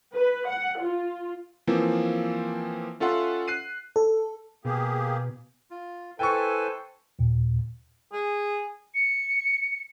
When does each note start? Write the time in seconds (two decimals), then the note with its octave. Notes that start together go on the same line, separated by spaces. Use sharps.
0.14 B4
0.48 F#5
0.82 F4
1.67 E3 F3 A#3 C4
3.00 C#4 F4 A4 E5 F#5 C6
3.48 F#6 C7 D#7
3.96 A4
4.65 B2 A#3 G4 G#4
5.71 F4
6.19 E4 A4 B4 C5 G5 G#5 C#6
7.19 D#2 A#2
8.13 G#4
8.94 C#7